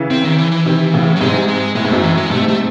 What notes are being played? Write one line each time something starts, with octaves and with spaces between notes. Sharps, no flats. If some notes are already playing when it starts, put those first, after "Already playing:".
Already playing: C#3 E3
C4
D#3
E3
E3
C3 D#3
A2 C#3
F#3
G#2 C3 G#3
G#3
A2 G#3
G#2
F#2 A2 A3
E3
G#3
G#2 C3 A3
A3